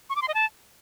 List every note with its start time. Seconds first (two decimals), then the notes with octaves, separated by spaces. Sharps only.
0.10 C#6
0.16 D6
0.22 C6
0.28 D#5
0.34 A5